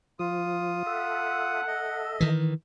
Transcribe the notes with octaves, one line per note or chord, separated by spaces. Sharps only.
F3 F4 D#6
A4 E5 F#5
D#5
D#3 E3